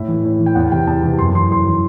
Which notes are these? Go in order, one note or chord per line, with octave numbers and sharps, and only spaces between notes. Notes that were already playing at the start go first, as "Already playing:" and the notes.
Already playing: A2 E5
E3
A2
E3
G5
E2 F#5
C3 E3 G5
E2 A5
C3 E3
F#2 C6
E3 C6
F#2 C6
E3